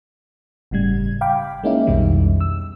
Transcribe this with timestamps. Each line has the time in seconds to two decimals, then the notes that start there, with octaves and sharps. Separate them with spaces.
0.71 G1 A2 C#3 G3 G#6
1.21 F5 G5 B5 D6
1.63 G#3 A#3 C#4 D#4 E4
1.87 B1 F2 B2 D#3 G3
2.41 E6